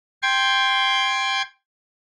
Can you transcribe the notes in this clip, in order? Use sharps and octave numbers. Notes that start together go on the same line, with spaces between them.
G5 C6 G#6